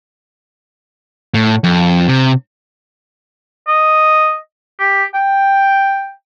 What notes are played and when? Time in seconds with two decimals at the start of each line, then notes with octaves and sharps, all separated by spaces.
1.34 A2
1.64 F2
2.08 C3
3.68 D#5
4.80 G4
5.15 G5